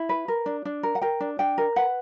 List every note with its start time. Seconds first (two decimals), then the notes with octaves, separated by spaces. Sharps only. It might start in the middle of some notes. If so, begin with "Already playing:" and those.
Already playing: E4
0.09 B4
0.28 A#4
0.46 D4
0.65 D4
0.83 A#4
0.95 F#5
1.02 A#4 G5
1.20 D4
1.39 D4 G5
1.58 A#4
1.76 B4 F#5